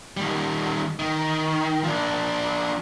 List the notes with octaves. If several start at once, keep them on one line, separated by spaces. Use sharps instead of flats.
D#3 G3
D#3
F3 D4